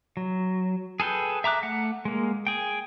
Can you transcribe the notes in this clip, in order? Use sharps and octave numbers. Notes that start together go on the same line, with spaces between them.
F#3
G#4 A4 B4 G5
E5 A#5 D6 F#6
A3 F#5
G#3 A#3
G#4 G5